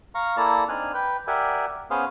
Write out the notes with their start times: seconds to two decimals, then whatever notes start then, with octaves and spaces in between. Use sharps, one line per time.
0.15 F5 A#5 C#6
0.37 A#3 E4 A4 D5 A5 A#5
0.69 C4 D4 D#4 G#5 F6 F#6
0.94 B4 G5
1.27 G4 A#4 D5 E5 F#5 G#5
1.90 B3 C#4 G#4 C5 F5